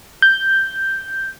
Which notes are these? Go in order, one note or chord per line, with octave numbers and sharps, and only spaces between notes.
G6